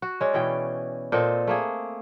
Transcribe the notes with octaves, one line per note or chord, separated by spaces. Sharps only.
F#4
G#3 C#4 D5
B2 E3 G5
A#2 C4 A4 D#5
A3 A#3 G#4